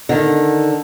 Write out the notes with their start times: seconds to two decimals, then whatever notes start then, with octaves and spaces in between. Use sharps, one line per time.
0.09 D3 D#3